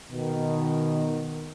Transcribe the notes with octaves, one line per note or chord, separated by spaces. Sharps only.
B2 D#3